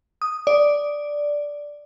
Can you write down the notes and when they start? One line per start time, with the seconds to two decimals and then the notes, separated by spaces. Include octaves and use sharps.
0.22 D#6
0.47 D5